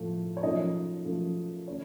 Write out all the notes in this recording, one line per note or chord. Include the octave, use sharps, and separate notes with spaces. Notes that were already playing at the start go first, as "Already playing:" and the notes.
Already playing: A2 F3 A3
C#5
F#2 F3 A3 D#4 D#5
F#2 F3 A3
D#3 A3 C#4 C#5